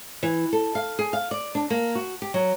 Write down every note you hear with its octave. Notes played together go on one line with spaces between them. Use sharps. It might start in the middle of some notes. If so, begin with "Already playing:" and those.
E3
A4
F5
G#4
F5
D5
D4
A#3
F#4
G4
F#3